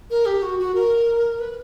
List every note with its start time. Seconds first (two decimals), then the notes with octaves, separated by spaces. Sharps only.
0.10 A#4
0.26 G4
0.42 F#4
0.59 F#4
0.75 A#4
1.40 B4